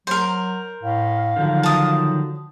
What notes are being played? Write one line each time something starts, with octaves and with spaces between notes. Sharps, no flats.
F#3 A#4 C5
A2 F5
D3 D#3 F3 F#3
A5 D#6